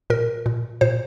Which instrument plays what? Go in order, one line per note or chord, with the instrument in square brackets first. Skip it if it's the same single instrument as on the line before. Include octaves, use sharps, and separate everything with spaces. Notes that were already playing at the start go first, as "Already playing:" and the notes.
[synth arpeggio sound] A#2 A#4
A#2
A#2 C5